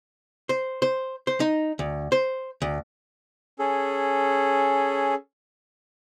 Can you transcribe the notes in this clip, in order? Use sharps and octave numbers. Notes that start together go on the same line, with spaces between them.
C5
C5
C5
D#4
D2
C5
D2
C#4 G#4 A4